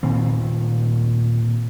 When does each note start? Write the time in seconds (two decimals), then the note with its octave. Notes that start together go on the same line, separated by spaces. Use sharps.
0.03 A#2 D#3 C4